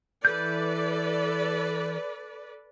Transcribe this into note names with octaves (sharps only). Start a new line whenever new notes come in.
E3 A4 B4 D5 G6